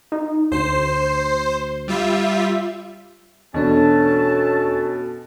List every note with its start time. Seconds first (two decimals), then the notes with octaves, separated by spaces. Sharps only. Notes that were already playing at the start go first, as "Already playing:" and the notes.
0.12 D#4
0.52 D2 C5 C7
1.88 G3 F4 E5
3.54 E2 B2 C#4 D4 A4 A5